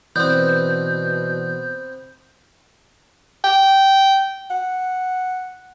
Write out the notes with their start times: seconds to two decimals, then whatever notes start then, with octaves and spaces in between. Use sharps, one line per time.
0.16 B2 E3 B3 C4 D5 G6
3.44 G5
4.51 F#5